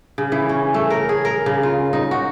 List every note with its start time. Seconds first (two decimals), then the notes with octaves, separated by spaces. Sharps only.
0.18 C#3
0.32 E3
0.49 C#4
0.74 A3
0.90 A#4
1.09 G#4
1.25 A#4
1.46 C#3
1.63 F4
1.93 D#4
2.11 F#4